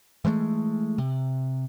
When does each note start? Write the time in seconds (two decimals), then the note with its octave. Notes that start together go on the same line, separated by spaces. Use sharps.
0.25 E3 F3 G#3 A3
0.98 C3